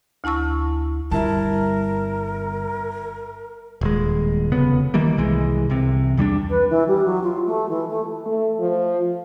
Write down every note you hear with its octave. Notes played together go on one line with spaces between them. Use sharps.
D2 E4 A5 C#6 E6
G1 G3 E4 A#4 A5
D#1 G#3
F1 C#3 B3
D#3 E3 G3 A#3
C2 E3 G#3
C2 C3
E2 G3 C#4 D4
B4
E3
G3
F#3
F4
A3
E3
A3
A3
F3